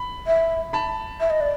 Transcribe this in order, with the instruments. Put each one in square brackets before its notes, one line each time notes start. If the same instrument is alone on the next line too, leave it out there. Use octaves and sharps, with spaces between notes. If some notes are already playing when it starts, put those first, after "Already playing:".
Already playing: [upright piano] B5
[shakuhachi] E5
[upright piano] A5 B5
[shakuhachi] E5
D#5
D5